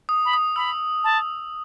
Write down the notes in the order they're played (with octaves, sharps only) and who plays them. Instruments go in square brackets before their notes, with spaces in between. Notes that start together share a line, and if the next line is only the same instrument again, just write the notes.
[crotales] D#6
[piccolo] B5
[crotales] D#6
[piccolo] B5 [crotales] E6
[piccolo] A5